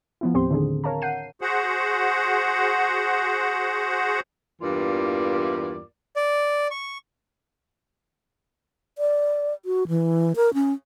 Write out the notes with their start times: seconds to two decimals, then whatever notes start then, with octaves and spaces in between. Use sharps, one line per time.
0.21 F3 B3 E4
0.34 D#2 A2 C4 G4 C5 C6
0.50 A2 D3 D#3 C4 D4 G#4
0.84 A#4 C#5 F5 A5 A#5
1.02 F#5 G6 C7 D#7
1.41 F#4 G#4 C5 F#5
4.62 E2 G2 E3 A#3 F4 D5
6.16 D5
6.71 C#6
8.98 D5
9.65 F#4
9.88 E3
10.36 A#4
10.54 C#4